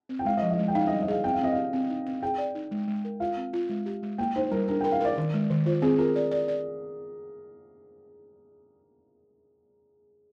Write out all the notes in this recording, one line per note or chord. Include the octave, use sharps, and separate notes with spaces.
C4
G5
G#3 F5
D#5
F3
D#5
G#3
G5
D#4 F5
D#5
G3
D#5
G#4 F5
C4 G5
F5
C4 D#5
G4 F5
C4
D#4
C4
G#4 G5
D5
D#4
G#3
G#3
A#4
F4 F5
C4
F4
G#3
G4
G#3
A#3 G5
D#4 C5
G3 A#4
D4 A#4
G5
A#4
F5
A#4 D5
D#3
G#3
D#3
F4 C5
C4 G#4
F4 A#4
D5
D5
D5